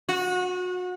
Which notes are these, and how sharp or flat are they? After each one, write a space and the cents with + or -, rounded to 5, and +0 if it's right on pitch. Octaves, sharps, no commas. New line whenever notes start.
F#4 -30